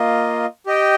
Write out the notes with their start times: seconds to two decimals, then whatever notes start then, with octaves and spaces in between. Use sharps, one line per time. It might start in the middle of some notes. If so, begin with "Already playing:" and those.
Already playing: A#3 F4 D#5
0.66 G4 D#5 G5